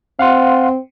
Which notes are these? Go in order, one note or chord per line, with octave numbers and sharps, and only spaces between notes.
C4 F5 F#5 C6